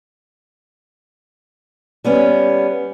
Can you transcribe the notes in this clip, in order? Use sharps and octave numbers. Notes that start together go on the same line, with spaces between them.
G3 B3 C#4